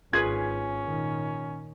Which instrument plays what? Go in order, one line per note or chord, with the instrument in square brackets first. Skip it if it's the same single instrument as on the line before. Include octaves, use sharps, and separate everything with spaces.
[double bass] G#1 [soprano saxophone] C#4 [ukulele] F4 G#4 B4 [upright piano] G#6
[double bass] A#2 D#3